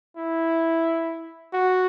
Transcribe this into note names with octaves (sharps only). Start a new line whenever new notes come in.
E4
F#4